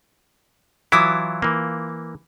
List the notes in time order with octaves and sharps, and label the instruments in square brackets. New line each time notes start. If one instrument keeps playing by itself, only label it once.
[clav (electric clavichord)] E3 F#3 E4 [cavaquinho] F4 D6 D#6
[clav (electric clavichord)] E3 A#3